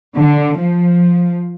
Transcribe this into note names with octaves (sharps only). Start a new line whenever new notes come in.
D3
F3